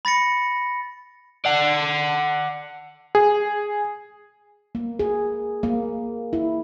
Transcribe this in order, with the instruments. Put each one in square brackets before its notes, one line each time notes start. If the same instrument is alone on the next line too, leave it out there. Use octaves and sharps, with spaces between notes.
[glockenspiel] B5 A6 A#6 C#7
[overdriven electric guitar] D5 F#5
[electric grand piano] G#4
[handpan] A#3
G#4
A#3
E4